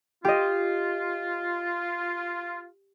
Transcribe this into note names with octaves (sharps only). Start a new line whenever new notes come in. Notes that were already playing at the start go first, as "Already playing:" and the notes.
F4 G4 D#5